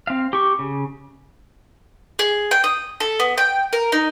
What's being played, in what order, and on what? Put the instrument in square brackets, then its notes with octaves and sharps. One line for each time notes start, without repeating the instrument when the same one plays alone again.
[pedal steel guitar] C4 F5
G4 C#6
C#3
[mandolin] G#4
G5
D#6
A4
B3
G5
A#4
D#4